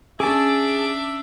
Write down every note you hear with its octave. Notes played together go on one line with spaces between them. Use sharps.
C#4 D4 G#4 E5 A5 D6